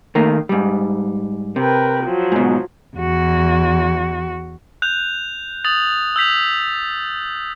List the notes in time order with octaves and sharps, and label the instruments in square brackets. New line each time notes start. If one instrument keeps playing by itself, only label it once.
[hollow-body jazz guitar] D#3 A3 A#3
G#2 G3
[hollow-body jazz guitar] C3 [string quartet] A#4 B4 G5
[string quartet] F3 F#3
[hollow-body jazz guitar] G#2 B2
[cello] E2 F#4
[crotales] F#6 G6 F7
D#6 A6 F7 F#7
E6 G6 B6 F7